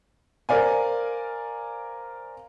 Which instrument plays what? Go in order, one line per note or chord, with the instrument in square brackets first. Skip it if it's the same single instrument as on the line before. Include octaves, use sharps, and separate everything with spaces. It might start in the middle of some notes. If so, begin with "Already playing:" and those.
[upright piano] A#4 C5 D5 F5 G#5